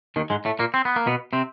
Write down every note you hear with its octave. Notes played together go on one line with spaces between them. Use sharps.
D#2 D#3
G#2 G#3
A2 A3
A#2 A#3
C4
B3
A#3
B2 B3
C3 C4